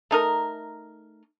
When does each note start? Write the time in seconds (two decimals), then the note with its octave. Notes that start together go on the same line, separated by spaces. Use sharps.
0.11 A3 D#4 A#4